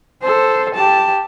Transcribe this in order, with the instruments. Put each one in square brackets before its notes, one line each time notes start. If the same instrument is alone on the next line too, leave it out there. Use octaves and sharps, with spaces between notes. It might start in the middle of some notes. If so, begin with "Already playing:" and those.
[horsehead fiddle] A4 C5
G4 A5